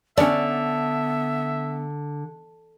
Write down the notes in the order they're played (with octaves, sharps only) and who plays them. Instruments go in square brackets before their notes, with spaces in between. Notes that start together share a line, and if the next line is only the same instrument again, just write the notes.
[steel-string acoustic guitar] D3 [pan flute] B3 [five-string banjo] C#4 D4 D5 [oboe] E5